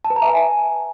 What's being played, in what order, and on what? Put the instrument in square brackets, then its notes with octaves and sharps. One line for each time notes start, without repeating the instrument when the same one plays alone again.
[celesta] A5
B4
A#5
E5
G#5